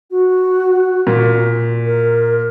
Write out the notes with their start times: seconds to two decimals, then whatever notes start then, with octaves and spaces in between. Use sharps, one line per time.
0.11 F#4
1.07 A#2
1.86 A#4